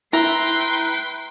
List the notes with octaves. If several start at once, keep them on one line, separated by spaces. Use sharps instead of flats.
E4 B4 G5 A#5 C6